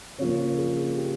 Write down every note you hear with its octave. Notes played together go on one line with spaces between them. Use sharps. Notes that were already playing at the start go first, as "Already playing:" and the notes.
C#3 F3 A#3 C#5
G#4
G4